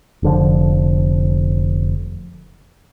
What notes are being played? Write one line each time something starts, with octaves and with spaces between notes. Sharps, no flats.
F1 D3 F3